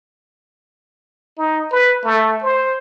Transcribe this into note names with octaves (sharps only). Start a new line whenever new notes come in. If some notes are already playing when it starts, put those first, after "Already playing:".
D#4
B4
A3
C5